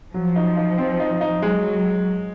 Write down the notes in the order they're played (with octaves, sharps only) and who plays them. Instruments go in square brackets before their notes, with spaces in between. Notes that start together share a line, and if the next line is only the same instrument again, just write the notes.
[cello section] F3 [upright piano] F#3
[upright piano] D#4
D#4
C4
D#4
D#4
[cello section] F#3 [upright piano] G#3